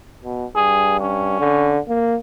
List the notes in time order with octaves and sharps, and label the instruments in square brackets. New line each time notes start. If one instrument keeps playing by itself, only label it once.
[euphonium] B2
[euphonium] G2 [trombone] G#4
[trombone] C#4
[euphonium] D3
A#3